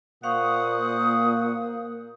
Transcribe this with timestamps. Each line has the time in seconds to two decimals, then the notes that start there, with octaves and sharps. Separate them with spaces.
0.24 A#2 A#3 C5 F5 F#5 C#6 D#6